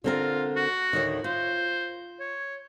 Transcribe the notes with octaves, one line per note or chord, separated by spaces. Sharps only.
D3 C4 F4 A#4
F#4
D2 A2 D#3
F4 C5
C#5